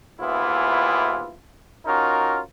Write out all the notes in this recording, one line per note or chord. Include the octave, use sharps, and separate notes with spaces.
D#2 G#2 E3 B3 E4 F4
C#4 D#4 F4 F#4 A#4